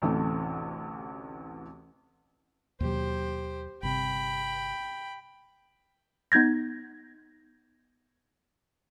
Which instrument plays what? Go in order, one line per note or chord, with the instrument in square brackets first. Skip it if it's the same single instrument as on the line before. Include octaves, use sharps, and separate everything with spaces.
[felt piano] A1 D2 C3 E3 A3
[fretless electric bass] D#2 B2 F#3 [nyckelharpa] G4 C5
[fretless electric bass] G1 C3 [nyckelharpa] G5 B5
[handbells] B3 D#4 G6 G#6 A#6